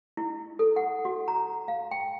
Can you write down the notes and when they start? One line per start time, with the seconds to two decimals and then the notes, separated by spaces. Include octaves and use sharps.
0.17 E4
0.59 A4
0.76 F#5
1.05 F#4
1.28 A#5
1.68 F5
1.91 G5